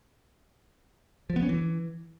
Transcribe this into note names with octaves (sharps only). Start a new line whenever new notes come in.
F3
B3
C#4
E3